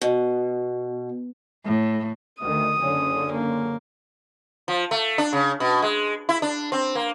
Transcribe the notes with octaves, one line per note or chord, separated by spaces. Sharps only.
B2
A2
D2 D#3 D#6
F#1 D3 C#4
A#3
F3
A3
D4
C#3
B2
G#3
E4
D4
C4
A#3